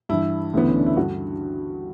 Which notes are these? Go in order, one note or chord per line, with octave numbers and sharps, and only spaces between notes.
G2 E3 E4
D2 C#3 E3 B3
C#4
D4
E4
G2 D3 F#4